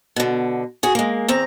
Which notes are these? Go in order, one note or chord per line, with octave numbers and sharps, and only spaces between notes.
B2 D3
F#4 G#4
G#3 A#3
E2 C4 A#5